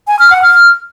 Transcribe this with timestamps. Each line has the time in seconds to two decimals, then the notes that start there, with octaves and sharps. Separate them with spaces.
0.07 G#5
0.19 F6
0.31 F#5
0.42 F6